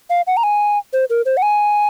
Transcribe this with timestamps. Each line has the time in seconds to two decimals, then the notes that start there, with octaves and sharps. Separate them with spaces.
0.10 F5
0.27 F#5
0.37 A#5
0.43 G#5
0.93 C5
1.10 A#4
1.26 C5
1.37 F#5
1.42 G#5